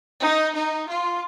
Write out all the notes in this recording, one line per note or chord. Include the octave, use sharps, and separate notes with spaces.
D#4
D#4
F4